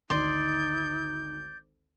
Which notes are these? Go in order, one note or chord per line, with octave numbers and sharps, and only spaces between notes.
G#1 D2 D3 D#4 D5 C6 G6